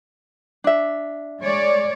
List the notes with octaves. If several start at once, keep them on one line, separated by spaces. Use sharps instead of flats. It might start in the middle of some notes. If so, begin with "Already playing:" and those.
D4 E5
G#3 C#5 D5